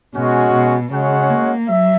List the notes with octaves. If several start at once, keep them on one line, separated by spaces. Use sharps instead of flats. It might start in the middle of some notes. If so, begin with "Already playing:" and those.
B2 G#3 C#4 F#4
B2
C#3 G#3 C#4 F#4 C#5 F#5
A#3
F#3 E5